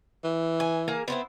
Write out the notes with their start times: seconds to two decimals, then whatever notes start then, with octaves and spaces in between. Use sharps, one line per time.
0.24 E3
0.60 G#5
0.88 A#3 G#4 A#4
1.08 B3 C4 E4